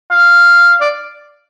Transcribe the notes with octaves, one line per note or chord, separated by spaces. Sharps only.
F5
D5